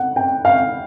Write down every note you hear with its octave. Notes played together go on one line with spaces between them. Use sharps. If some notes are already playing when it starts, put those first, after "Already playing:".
Already playing: F#5
G5
F5